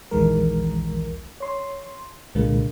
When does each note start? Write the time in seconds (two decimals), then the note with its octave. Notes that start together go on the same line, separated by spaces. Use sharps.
0.11 A#1 D#2 D#3 E3 G#3 A#4
1.40 C#5 C6
2.35 C2 A#2 D3 G#3 A#3